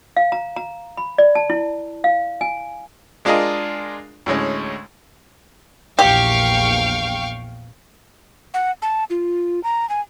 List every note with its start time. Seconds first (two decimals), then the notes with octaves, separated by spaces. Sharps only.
0.17 F5
0.32 A#5
0.56 A#5
0.97 B5
1.18 D5
1.35 A5
1.50 E4
2.04 F5
2.41 G#5
3.25 G#3 D4 F4 G#4 A#4 D#5
4.26 D2 A2 G#3 C#4
5.99 A#1 E2 A#2 G4 F5 G5 C#6
8.54 F#5
8.82 A5
9.10 F4
9.63 A#5
9.89 G#5